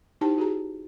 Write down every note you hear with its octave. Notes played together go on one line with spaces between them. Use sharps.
D#4 E4 G4 C5 G5 A5
F#4 G#4 A#5